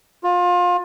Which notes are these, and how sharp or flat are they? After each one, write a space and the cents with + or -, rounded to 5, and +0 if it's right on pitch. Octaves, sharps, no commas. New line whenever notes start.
F4 +25